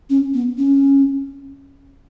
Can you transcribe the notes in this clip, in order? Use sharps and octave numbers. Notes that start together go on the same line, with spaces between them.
C#4
B3
C#4